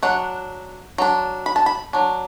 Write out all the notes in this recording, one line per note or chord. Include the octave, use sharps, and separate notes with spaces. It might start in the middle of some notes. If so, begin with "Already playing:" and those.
F#3 D4 F#5
F#3 D4
B5
A5
B5
F#3 D4